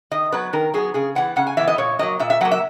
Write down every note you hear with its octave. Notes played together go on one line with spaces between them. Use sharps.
D#3 D#5
F#3 B3 B4
D#3 A#4
F#3 B3 G#4
C#3 G#4
E3 B3 F#5
C#3 F#5
G#5
E3 B3 E5
D#5
A#2 C#5
F#3 A#3 D#5
A#2 E5
E5
F#3 A#3 F#5
E5